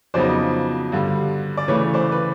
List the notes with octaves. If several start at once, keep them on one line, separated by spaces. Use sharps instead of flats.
F2 C#3 F#3 B3 D#4 C5 D5
G2 D3 G3
D5
C#3 E3 A3 B4 C#5
C5 D5
B4